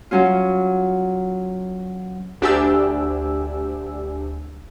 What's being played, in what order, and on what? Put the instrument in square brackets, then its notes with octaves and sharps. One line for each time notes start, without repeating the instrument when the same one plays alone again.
[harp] F#3 C#4 F4
[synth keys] D2 D4 G4 G#5 E6